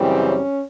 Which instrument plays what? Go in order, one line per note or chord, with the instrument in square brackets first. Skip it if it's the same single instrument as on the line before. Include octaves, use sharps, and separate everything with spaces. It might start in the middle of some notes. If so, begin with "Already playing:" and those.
Already playing: [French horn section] F#2 C#3 E3 G3 C4
C#4